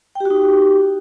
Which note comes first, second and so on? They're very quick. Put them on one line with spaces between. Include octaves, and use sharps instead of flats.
G5 G4 F#4 D#4